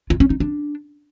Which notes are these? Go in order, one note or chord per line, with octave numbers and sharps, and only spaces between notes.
F4
C#4
D#4
D4